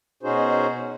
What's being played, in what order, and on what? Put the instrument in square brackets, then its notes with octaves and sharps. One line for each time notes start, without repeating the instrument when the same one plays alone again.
[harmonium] B2 C#4 D#4 F#4 G#4 C5